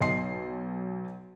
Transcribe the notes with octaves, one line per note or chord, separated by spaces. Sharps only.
B1 D#5 C6 C7